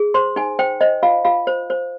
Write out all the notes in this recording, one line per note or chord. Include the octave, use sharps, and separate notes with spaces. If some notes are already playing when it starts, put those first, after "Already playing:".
Already playing: G#4
C5 C6
D#4 G#5
C5 G5
C5 D#5
F4 F5
F4 F5
C5
C5